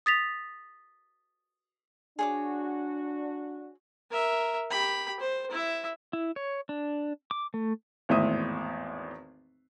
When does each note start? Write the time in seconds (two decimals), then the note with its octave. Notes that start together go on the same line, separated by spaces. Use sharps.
0.06 D#6 A6 B6 F7
2.19 D4 F#4 G#4 C#5 D6
4.11 A#4 E5
4.70 G4 B5
5.20 C5
5.51 E4 E5
6.13 E4
6.36 C#5
6.69 D4
7.31 D6
7.54 A3
8.09 G#1 E2 A2 C5 E5 D#6